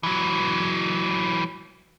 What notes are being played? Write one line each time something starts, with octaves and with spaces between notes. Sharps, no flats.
E3 F#3